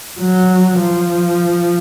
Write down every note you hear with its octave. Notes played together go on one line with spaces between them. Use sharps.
F#3
F3